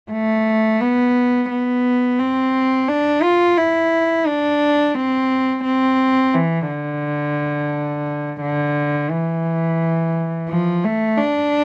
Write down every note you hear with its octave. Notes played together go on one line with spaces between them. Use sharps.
A3
B3
B3
C4
D4
F4
E4
D4
C4
C4
E3
D3
D3
E3
F3
A3
D4